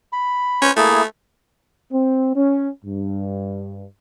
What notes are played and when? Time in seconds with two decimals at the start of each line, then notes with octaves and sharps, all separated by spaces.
0.13 B5
0.62 C#4 B4 C5
0.77 A3 A#3 E4 G#4
1.92 C4
2.35 C#4
2.84 G2